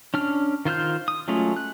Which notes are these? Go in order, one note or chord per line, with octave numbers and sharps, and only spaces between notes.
C#4 D4 F6
D#3 F4 C5 F6 G6
D#6
F#3 G#3 A3 C#4 F4
F#6